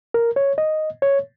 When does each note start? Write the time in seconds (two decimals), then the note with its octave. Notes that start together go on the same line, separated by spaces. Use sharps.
0.14 A#4
0.36 C#5
0.58 D#5
1.02 C#5